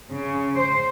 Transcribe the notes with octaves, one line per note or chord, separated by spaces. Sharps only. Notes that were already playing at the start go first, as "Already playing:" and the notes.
C#3
C5